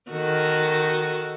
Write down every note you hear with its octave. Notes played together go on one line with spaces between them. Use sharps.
D#3 F#4 A4